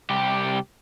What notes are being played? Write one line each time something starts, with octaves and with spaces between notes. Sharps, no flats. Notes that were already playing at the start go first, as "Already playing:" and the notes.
C2 G4